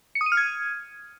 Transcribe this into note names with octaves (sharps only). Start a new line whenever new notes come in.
C#7
D#6
D#7
F6
G#6